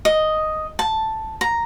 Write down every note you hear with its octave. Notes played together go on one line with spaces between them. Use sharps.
D#5
A5
A#5